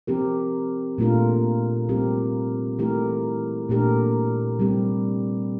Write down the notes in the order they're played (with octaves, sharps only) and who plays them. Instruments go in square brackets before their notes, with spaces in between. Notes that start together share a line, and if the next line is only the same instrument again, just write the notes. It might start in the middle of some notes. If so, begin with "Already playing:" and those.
[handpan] F3 C4 G4 A#4
A#2 A3 D4 F4 A#4
G3 C4 G4 A#4
E3 A3 E4 G4 A#4
A#2 A3 D4 G4 A#4
G3 C4 G4